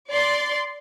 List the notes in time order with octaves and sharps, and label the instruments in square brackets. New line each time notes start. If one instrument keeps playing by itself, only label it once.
[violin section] D5 C6